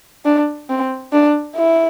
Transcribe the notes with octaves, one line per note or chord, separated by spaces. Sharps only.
D4
C4
D4
E4